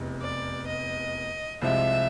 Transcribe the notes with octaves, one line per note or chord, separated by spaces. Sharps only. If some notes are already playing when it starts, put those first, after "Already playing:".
Already playing: F1 E2 C3
D5
D#5
C2 C3 F3 G#3 E5